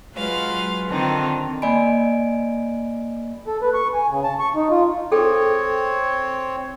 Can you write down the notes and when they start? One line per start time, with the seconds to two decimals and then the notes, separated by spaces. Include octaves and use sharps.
0.16 F#3 G#3 F4 B4 F5
0.89 D3 D#3 C4 D4 D#4 F4
1.62 A#3 D5 D#5 G#5 B5 D7
3.47 A4
3.62 B4
3.74 C#6
3.94 G#5
4.10 C#3
4.24 A5
4.40 C#6
4.55 D#4
4.71 F4
5.12 C4 G#4 A4 C#5 G5